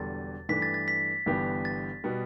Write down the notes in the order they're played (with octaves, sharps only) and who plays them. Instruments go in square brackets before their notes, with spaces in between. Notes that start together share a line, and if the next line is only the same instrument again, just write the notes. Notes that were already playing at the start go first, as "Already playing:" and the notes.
Already playing: [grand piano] E1 E2 D3 G3 [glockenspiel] A6
[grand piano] G2 E3 A3 D4 [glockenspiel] B6
[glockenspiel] A6
A6
B6
[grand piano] G1 G2 E3 B3 G4
[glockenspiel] A6
[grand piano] B2 G3 B3